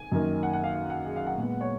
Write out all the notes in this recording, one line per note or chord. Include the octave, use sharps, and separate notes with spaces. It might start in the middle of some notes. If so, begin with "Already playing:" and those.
Already playing: G#5
F#2 D#3 A#3
F#5
F#5
F5
F5
F#5
G#4
F5
F#5
A#2 G#3 B3
C#5